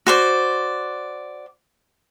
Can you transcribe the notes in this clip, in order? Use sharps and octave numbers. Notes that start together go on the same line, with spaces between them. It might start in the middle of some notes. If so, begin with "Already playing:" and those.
F#4 C5 D5